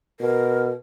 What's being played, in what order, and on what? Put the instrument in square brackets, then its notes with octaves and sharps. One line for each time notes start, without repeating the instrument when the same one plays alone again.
[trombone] B2 [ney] A#4